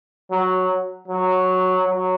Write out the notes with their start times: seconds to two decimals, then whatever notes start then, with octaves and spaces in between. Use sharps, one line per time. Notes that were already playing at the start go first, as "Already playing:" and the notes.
0.31 F#3
1.08 F#3
1.84 F#3